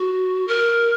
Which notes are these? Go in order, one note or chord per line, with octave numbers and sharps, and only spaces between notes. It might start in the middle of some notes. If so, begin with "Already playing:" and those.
Already playing: F#4
A#4